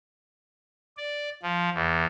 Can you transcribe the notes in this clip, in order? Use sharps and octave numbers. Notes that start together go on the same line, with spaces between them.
D5
F3
E2